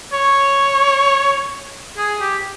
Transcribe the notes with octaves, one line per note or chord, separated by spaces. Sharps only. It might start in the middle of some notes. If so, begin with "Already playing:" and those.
C#5
G#4
G4